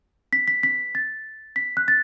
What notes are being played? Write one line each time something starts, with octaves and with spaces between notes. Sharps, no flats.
B6
B6
B6
A6
B6
F#6
A6